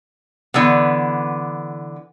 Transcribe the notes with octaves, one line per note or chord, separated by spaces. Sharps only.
D3 E3 B3